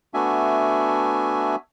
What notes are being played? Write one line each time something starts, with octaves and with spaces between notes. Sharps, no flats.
A3 B3 D4 F#4 E5 G#5